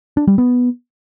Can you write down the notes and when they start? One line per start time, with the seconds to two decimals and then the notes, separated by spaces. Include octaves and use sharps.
0.17 D4
0.27 G3
0.38 B3